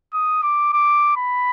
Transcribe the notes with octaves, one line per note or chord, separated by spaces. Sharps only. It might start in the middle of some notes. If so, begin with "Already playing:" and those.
D#6
D6
D6
B5